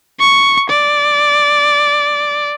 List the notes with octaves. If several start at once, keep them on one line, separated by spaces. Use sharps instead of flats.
C#6
D5